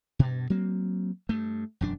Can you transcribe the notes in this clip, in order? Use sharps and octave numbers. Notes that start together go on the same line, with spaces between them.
G2 B2
F#3 A#3 C4
G2 A3
E1 F#2 D4